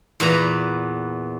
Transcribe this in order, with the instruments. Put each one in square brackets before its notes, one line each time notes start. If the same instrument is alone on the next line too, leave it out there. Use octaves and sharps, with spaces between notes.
[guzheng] E2 A#2 B4 A#5